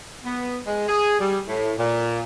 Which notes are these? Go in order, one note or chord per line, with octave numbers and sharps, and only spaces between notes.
B3
G#3
G#4
G3
A2
A#2